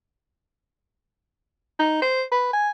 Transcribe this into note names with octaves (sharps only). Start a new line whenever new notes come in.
D#4
C5
B4
G#5